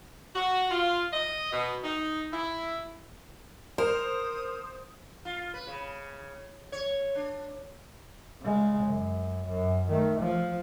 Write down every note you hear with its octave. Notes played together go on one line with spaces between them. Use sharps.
F#4
F4
D#5
B2
D#4
E4
A#4 C5 D#6
F4
B4
C#3
C#5
D4
C#3 G#3
F#2
F#2
D#3 A3
F3